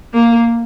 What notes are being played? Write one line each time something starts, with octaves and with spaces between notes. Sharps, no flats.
A#3